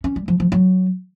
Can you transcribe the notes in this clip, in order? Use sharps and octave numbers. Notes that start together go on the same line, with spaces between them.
C#4
G3
F3
F3
F#3